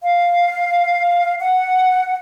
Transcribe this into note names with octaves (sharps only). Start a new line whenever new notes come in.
F5
F#5